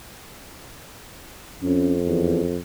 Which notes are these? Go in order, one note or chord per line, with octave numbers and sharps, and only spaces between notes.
F2 C#4
E2